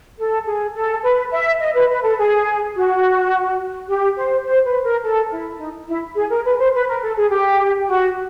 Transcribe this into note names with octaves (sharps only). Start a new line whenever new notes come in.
A4
G#4
A4
B4
E5
D#5
B4
B4
A4
G#4
F#4
G4
C5
C5
B4
A#4
A4
E4
D#4
E4
G#4
A#4
B4
C5
B4
A#4
A4
G#4
G4
F#4